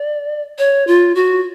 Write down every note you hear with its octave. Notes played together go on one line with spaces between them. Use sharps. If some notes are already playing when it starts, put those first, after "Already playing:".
Already playing: D5
C#5
F4
F#4